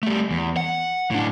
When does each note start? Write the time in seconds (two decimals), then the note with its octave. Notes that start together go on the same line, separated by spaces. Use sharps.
0.03 G3 A3
0.31 E2
0.57 F#5
1.11 A2 D4